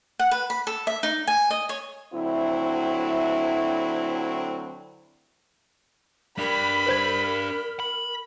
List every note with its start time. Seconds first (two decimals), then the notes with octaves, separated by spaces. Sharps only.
0.19 F#5
0.31 B4
0.50 B5
0.67 A4
0.87 E5
1.03 D#4
1.27 G#5
1.50 D#5
1.69 C#5
2.13 D2 F#3 C4 E4
6.39 D4 G4 A#4 B5
6.86 B4 C5 G#6
7.80 B5